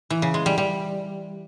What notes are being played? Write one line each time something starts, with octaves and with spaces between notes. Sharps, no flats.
E3
C#3
G#3
G3
G3